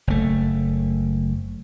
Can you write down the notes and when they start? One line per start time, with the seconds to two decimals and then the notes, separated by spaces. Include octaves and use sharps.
0.07 F#1 A3